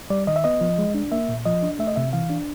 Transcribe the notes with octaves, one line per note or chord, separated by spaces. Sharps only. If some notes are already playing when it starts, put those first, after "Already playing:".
G3 D5
D#3 D#5
E5
B3 D#5
F3
G#3
D4
A#3 E5
A#2
F3 D#5
D4
A3 E5
D#5
C3 E5
E3 F5
D4